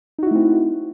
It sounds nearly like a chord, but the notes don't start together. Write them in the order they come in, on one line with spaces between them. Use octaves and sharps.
D#4 F#4 E4 A3 C4